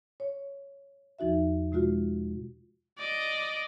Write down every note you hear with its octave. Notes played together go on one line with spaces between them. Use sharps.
C#5
E2 F3 D#4 F#4 E5
B2 G#3 F4 F#4
D5 D#5